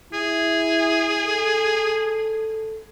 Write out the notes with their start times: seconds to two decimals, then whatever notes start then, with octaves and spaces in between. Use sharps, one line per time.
0.13 E4 G#4
1.26 A4